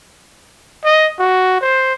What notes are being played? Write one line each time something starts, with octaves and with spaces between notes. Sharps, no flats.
D#5
F#4
C5